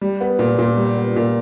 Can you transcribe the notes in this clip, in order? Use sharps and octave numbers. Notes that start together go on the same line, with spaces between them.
G3
B3
A#2
A#2
G3
B3
A#2